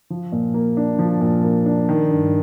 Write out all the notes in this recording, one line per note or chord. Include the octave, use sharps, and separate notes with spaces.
F3
A#2
A#3
D4
F3
A#2
A#3
D4
D#3
G2